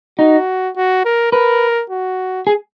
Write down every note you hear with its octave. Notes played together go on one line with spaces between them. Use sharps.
D#4 F#4
F#4
A#4
A#4 B4
F#4
G#4